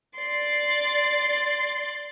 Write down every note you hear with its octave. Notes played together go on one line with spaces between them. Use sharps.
D5 C6